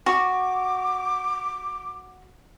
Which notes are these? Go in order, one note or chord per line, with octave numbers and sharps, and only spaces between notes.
F#4 D6